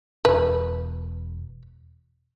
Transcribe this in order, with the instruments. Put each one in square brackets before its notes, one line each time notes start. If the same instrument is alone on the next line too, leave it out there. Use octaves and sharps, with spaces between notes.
[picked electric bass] E1 E2 B2 [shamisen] B4